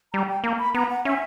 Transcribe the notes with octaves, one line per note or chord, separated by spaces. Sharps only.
G3 A#5
G5
A#3 A#5
B5
B3 A#5
F#5
C#4 E5